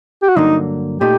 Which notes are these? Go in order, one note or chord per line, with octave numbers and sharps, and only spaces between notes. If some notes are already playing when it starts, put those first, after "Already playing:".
G4
F#4
G2 D3 F#3 A#3 D#4
A#2 A3 D#4 G4